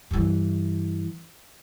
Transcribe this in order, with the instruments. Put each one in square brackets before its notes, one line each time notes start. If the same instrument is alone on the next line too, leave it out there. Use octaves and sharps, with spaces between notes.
[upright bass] G2 E3